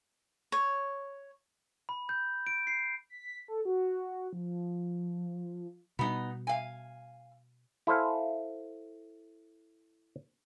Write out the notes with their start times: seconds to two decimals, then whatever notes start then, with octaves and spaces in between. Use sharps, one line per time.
0.52 C#5
1.89 B5
2.09 G6
2.47 D7
2.67 C7
3.10 B6
3.48 A4
3.65 F#4
4.33 F3
5.99 B2 G3 B3 D#4
6.47 F5 G#5
7.87 E4 A4 C5 F5 G#5